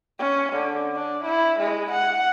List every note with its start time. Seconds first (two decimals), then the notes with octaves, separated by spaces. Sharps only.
0.19 C#4
0.53 D3
0.95 D4
1.25 E4
1.60 G#3
1.91 F#5